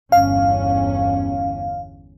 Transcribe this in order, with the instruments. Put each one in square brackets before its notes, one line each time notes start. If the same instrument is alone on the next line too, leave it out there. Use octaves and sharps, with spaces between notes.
[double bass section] G1 E2 C#4 [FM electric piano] F5